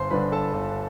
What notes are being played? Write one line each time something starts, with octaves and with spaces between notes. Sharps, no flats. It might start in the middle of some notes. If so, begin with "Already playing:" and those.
Already playing: G1 C5 C6
G2 D3 B4 B5
A4 A5
G1